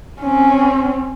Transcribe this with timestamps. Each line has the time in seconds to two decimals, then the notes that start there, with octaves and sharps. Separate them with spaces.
0.21 C4 C#4